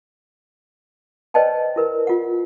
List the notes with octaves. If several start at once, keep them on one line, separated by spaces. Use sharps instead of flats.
B4 C5 D5 D#5 G5 A5
E4 A#4 B4
F4 F#5